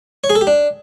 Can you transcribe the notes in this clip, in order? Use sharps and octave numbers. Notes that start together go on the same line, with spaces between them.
C#5
G#4
A4
G4
D4